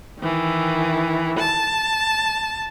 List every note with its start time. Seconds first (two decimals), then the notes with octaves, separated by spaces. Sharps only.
0.20 D#3 E3
1.39 A5